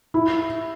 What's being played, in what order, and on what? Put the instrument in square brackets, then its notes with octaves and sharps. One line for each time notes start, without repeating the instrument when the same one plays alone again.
[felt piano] E4